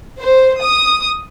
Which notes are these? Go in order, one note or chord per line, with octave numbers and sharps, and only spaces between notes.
C5
D#6